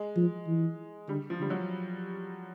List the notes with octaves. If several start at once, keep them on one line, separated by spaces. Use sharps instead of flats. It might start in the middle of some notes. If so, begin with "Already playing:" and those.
Already playing: G#3
F3
E3
D3 G3
F3
D3 G3
F#3